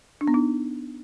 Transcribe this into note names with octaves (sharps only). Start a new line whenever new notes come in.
D4
B3
D#4